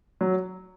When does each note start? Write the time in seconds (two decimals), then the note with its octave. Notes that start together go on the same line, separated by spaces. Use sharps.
0.21 F#3